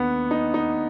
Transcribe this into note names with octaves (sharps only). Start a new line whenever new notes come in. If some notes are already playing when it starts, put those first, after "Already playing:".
Already playing: D#2 D#3 B3 D4
D#4
D#4